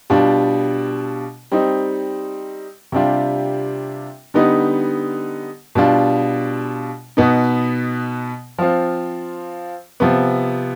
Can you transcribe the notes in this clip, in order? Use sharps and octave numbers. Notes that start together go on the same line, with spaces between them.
B2 G3 D4 F4
G3 C4 D#4
C3 G3 D4 F4
D3 G3 B3 D#4
B2 G3 D4 F4
B2 B3 D#4
F3 C4 F4
C3 F3 B3